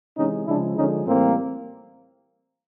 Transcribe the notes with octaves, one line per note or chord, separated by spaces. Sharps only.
C3 E3 G#3 C#4 D#4
C#3 F3 G#3 D4 E4
D3 F3 G#3 C#4 D#4
A2 E3 G3 A#3 C4